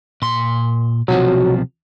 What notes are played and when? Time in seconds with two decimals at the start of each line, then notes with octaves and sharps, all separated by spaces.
0.22 A#2 C6
1.08 B1 C3 F3 F#3